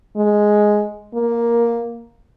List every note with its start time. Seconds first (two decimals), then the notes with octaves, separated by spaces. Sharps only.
0.17 G#3
1.14 A#3